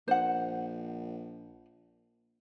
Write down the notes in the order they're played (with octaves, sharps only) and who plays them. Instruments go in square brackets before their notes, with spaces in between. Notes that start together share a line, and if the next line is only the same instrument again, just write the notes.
[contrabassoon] A#1 [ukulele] C5 F#5